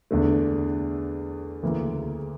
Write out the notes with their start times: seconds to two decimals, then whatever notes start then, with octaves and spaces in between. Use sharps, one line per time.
0.11 E2 D3 A3
1.63 D2 C#3 E3 A#3